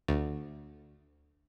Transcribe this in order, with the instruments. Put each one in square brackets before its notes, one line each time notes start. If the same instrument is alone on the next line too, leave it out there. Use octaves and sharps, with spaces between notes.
[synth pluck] D2